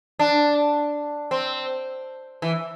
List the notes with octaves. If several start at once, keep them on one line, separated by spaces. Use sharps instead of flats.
D4
C4
E3